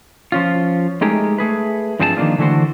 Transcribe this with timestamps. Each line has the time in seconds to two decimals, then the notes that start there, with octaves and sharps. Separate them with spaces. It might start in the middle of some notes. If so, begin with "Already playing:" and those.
0.32 F3 C#4 F4
1.01 G#3 A3 D#4 G4 G#4 A#4
1.38 A3 G#4 B4
1.99 G2 F3 C4 G#4 A4 A5
2.17 D#3 F3 F#3 A#3 D4 F4
2.38 D3 E3 A3 E4 F#4 C5